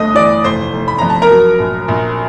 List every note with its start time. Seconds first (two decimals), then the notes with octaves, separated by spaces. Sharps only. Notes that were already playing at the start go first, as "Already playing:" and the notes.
Already playing: G1 G2 A3 D#5 D#6
0.14 E3 D5 D6
0.44 F1 C5 C6
0.73 F1
0.88 B5
0.98 F2 A#5
1.10 A5
1.22 A#4 A#5
1.31 F#3
1.59 A#1
1.88 A#1